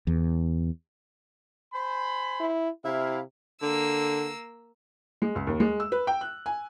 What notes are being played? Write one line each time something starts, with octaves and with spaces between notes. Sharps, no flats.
E2
C5 G#5 B5
E4
C3 E4 F5
D3 A#3 E6
G#3
C#2
D#2
G#3
E6
B4
G5
F#6
G#5